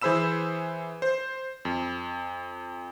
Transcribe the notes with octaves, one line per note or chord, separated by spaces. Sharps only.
E3 G#4 C5 B5 E6 E7
C5
F2